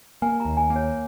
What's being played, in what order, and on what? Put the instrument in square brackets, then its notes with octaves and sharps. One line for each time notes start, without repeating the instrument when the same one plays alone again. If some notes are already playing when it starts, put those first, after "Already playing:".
[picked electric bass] A#3 [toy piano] G#5
[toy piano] A#5
[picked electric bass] D#2
[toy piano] G#5
[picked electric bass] A#3
[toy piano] C#5